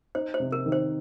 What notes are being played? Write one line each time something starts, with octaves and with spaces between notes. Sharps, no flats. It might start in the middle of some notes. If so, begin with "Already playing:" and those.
D#4 C5
C5
C3
A#4
D#3
C5